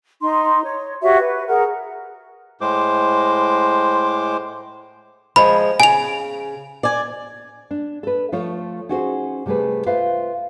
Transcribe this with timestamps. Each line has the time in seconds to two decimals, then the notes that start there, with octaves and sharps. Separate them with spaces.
0.21 D#4 C6
0.65 C#5
1.02 F#4 G4 C#5 E5
1.19 B4
1.48 G#4 A#4 F#5
2.61 A2 G#3 C5 D6
5.36 F3 G#3 B5
5.80 C#3 G#5 F7
6.83 D5 G#5
7.71 D4
8.03 A4 B4
8.32 F3 A3 F4 C#5
8.89 C#4 D#4 F#4 G#4 B4 C5
9.46 C3 G3 A3 G#4 B4
9.86 F4 B4 C5 E5 F5